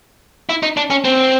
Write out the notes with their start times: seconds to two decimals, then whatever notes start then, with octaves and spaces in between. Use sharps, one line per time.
0.49 E4
0.63 D#4
0.77 D4
0.90 C#4
1.05 C4